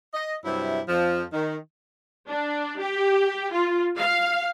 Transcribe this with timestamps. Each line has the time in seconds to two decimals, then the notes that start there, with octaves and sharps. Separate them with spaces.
0.14 D#5
0.44 G2 C3 F#3 E4
0.88 F2 F3
1.33 D#3
2.28 D4
2.79 G4
3.52 F4
3.98 F5